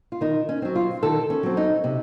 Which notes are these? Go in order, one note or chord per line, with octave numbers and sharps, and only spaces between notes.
F4
D#3 D#4
C#4
F#3 C4
F4
D#3 A4
C#4
F#3 C4
D#4
C3